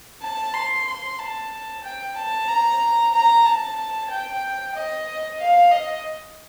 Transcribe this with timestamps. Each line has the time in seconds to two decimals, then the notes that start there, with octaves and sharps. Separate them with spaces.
0.22 A5
0.54 C6
0.87 C6
1.19 A5
1.84 G5
2.16 A5
2.49 A#5
3.13 A#5
3.45 A5
4.10 G5
4.74 D#5
5.39 F5
5.72 D#5